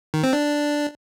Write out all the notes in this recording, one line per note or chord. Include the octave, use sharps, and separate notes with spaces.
D#3
C4
D4